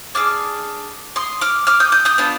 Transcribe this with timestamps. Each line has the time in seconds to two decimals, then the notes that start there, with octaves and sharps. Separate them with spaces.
0.15 D4 G#4 D6 F6
1.16 C6 D#6
1.41 D6 F6
1.67 D6 F6
1.80 D#6 G6
1.92 D#6 G6
2.05 D#6 G6
2.18 B3 D4 F4